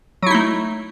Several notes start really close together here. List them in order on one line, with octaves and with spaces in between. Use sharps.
F#3 E4 D#4 A3